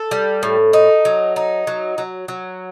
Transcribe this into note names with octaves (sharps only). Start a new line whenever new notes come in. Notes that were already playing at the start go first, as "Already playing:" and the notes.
Already playing: A4
G3
A2
D#4
F#3
D#4
F#3
F#3
F#3